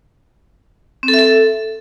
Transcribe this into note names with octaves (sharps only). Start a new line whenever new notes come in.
C4
A4
E5
A4